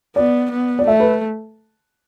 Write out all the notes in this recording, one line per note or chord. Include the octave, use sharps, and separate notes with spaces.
B3 D5
B3
D5
A3 E5
B4